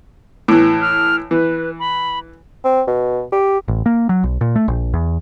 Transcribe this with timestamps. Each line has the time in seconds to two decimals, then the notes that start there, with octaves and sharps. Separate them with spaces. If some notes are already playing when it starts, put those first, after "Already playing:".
0.48 A2 E3
0.82 F6
1.31 E3 B4
1.79 B5
2.64 C4
2.87 B2
3.32 G4
3.68 A1
3.86 A#3
4.09 F#3
4.24 B1
4.41 A#2
4.56 A3
4.68 A#1
4.94 E2